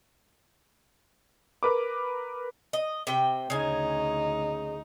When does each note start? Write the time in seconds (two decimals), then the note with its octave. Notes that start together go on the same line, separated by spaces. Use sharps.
1.63 A#4 B4 D6
2.73 D#5
3.07 C3 G5
3.50 D2 C#3 D#4 G#5